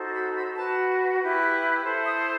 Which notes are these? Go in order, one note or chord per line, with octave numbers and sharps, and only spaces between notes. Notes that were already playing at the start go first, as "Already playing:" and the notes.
Already playing: D#4 F#4 A4 C5
B5
B5
F#4 B4 A5
E4 G4 B4
E4 A4 C5
D#6